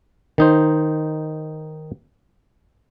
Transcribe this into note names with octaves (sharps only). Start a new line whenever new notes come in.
D#3 D#4 C5